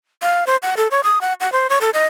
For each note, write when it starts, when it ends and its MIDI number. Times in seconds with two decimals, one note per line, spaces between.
0.22 0.44 77
0.47 0.56 72
0.63 0.75 78
0.77 0.88 69
0.91 1.01 73
1.04 1.19 87
1.21 1.33 78
1.41 1.52 78
1.52 1.67 72
1.70 1.79 73
1.81 1.90 69
1.94 2.06 75